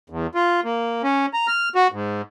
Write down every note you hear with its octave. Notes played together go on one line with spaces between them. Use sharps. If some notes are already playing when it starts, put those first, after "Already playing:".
E2
F4
A#3
C#4
A#5
F6
F#4
G#2